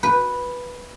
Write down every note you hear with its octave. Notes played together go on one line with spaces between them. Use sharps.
B4